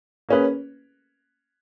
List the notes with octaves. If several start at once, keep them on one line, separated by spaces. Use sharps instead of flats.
A#3 C#4 G#4 B4